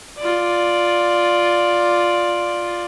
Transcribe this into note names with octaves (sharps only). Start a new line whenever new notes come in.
F4 D5